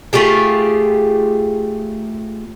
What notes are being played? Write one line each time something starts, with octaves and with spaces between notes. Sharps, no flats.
A3 F4 G4 G#4